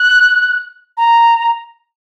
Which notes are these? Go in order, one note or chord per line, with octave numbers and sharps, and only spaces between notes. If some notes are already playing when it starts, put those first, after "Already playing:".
Already playing: F#6
A#5